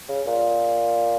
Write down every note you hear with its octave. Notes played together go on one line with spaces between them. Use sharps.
C#3
A#2